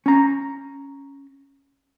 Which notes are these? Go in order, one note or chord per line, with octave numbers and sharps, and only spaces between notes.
C#4 A#5